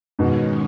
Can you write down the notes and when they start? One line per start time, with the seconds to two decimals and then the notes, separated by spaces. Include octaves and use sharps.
0.19 G#2 B2 D#3 G#3 C#4